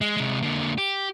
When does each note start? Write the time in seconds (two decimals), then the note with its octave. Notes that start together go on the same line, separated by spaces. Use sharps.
0.01 G#3
0.17 C3 G#3
0.42 D3 A#3
0.78 G4